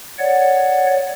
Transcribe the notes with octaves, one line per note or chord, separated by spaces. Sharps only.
C#5 D5 F#5